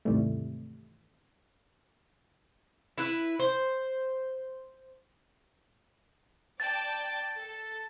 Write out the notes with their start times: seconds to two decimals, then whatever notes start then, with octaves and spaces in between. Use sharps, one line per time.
0.05 D#2 G#2 C3 E3 G3 A3
2.98 E4 B4
3.39 C5
6.60 D5 G5 A5 A6
7.38 A4